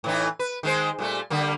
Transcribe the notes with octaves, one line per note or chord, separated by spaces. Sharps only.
A2 E3 D#4
B4
D#3 G#3 C5
A#2 G3 A3
D3 G3 A#3